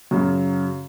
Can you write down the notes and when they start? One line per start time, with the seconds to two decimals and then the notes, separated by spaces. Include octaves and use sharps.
0.11 F#2 C#3 F#3